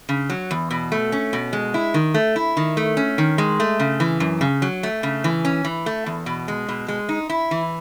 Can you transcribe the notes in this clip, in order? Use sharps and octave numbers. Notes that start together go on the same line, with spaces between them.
C#3
F#3
E2
B2
A3
C#4
B2
G#3
E4
D#3
A3
E4
D#3
A3
C#4
D#3
G#3
A3
C#3
E3
F#2
C#3
F#3
A3
C#3
E3
C#4
E3
A3
E2
B2
G#3
B2
G#3
D#4
E4
E3